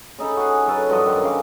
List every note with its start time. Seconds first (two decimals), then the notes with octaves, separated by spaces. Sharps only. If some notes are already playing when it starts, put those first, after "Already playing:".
0.19 C#3 D#4 A4 B5
0.37 F#4 G#4
0.67 F#3 A4 B4
0.90 G2 F3 F#4 D#5
1.06 F#2 D#3
1.23 C#3 F5 D6